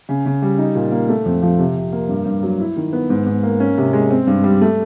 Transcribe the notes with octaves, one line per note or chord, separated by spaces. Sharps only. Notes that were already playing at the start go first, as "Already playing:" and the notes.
C#3
C#3
G3
D#4
A#2
A#3
A3
F2
F3
C3
C3
A#3
G2
G2
F#3
E4
D#3
B3
G#2
G#2
A#3
C#4
C3
G#3
C4
G2
G3
A3